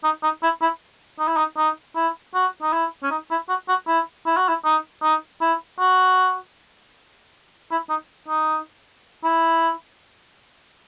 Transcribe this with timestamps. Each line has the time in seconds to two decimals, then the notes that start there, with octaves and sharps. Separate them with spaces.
0.04 D#4
0.23 D#4
0.43 E4
0.62 E4
1.19 D#4
1.28 E4
1.37 D#4
1.57 D#4
1.96 E4
2.34 F#4
2.62 D#4
2.73 E4
3.03 C#4
3.11 D#4
3.31 E4
3.49 F#4
3.68 F#4
3.87 E4
4.26 E4
4.37 F#4
4.48 E4
4.65 D#4
5.02 D#4
5.41 E4
5.79 F#4
7.71 E4
7.89 D#4
8.28 D#4
9.24 E4